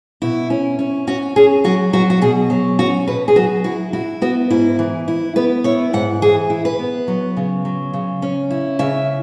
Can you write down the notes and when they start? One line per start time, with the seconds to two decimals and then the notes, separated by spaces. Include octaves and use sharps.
0.22 B2 E4
0.50 C#4
0.79 C#4
1.07 C#4 F#4
1.36 C#4 G#4
1.64 F#3 F#4
1.93 F#3 F#4
2.10 F#4
2.22 B2 G#4
2.50 F#3
2.79 C#4 F#4
3.07 B2 B4
3.28 G#4
3.36 F#3 F#4
3.64 E4 F#4
3.93 E4 F#4
4.22 B3 F#4
4.50 G#2 E4
4.79 E3
5.08 E4
5.36 B3 B4
5.64 E4 C#5
5.93 G#2 F#5
6.22 E3 G#4
6.50 E4
6.65 B4
6.79 B3
7.08 F#3
7.37 C#3
7.65 F#3
7.93 C#3
8.22 C#4
8.50 E4
8.79 C#3 E5